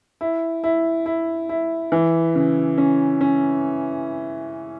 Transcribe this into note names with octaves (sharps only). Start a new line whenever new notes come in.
E4
E4
E4
E4
E3
C#3
C#4
C#4